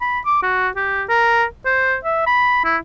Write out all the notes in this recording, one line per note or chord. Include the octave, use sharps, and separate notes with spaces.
B5
D6
F#4
G4
A#4
C5
E5
B5
E4